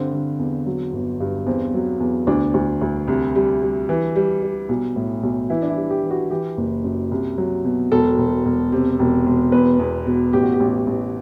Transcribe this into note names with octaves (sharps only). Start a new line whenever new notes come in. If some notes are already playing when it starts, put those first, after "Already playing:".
Already playing: G2 D3 C4
D3
E2
F#3
G1
G2
E2 C4
F#3
E2
D2 D4
D2
D2
C2
G3
G3
E3
G3
G3
B1
A2
B1
E3 E4
D4
E4
G3
G4
E3
F#4
E3 G4
F#1
F#2
C2
F#3
B2
E1 A4
E1
E1
C3
E1
E1
E2 B4
E2
B2
A1 G4
F#4
G4
A1
A1